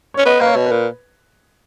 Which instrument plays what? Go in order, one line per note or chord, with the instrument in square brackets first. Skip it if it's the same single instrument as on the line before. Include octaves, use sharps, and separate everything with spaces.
[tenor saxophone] C#4 [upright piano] C#5
[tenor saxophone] B3 [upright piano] D#5
[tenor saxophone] A#3 [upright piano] B4
[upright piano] C#5
[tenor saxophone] B2
[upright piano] B4
[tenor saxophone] A#2